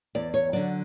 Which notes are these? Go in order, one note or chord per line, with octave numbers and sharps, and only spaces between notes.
E2 D5
C#5
D3 F#3 D5